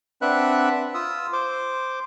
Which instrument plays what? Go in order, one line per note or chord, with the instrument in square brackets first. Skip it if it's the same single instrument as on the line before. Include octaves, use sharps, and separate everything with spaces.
[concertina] C4 D4 B4 E5 F#5 F#6
F4 D#6 E6
C5 D6